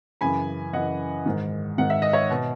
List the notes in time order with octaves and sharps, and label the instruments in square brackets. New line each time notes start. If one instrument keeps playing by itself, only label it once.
[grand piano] F#2 C#3 E3 G#5 B5
F#2 C#3 E3 D#5 F#5
G#2 D#3
G#2 D#3 F#5
E5
D#5
C#5 E5
B2